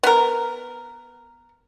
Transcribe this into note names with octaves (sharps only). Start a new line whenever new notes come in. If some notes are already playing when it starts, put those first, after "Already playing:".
B3 A#4